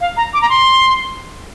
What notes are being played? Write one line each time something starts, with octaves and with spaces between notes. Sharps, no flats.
F5
A#5
D6
A#5
C6